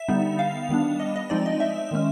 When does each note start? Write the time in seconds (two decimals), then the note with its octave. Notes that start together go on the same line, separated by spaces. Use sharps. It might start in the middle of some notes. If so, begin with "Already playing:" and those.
Already playing: E5
0.08 D3 G3 B3 D#4
0.39 F5
0.69 D#3 G3 B3 D4
1.00 D#5
1.16 D#5
1.30 F3 G#3 C4 D#4 D5
1.46 D#5
1.60 E5
1.91 D#3 G#3 C#4